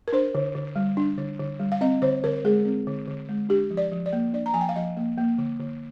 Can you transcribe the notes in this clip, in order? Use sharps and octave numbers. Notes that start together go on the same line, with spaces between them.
A#4
D4 C5
D3
D3
G3
D4
D3
D3
G3
F5
C4 D#5
D3 C5
D3 A#4
G#3 G#4
C4
D3
D3
G#3
D4 G4
F3
D5
F3
D5
A#3
D4 D5
A#5
F3 G#5
G5
F5
F3 D#5
A#3
A#3
D3
D3